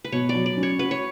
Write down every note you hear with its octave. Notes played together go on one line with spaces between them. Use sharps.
B4
B2 C#5
D5
F#3
D5
C#4
C#5
F#4 B4
C#5